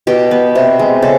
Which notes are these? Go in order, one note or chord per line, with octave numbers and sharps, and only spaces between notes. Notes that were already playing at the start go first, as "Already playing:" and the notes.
B2 G4
B3
C3
G#3
C#3 A4